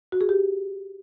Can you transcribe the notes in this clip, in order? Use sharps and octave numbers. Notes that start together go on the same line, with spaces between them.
F#4
G#4
G4